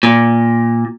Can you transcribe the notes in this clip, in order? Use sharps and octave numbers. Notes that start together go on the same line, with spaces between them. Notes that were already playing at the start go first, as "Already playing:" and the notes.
A#2